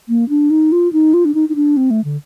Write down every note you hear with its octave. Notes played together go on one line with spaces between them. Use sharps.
A#3
D4
D#4
F4
D#4
F4
D4
D#4
D#4
D4
C4
A3
D3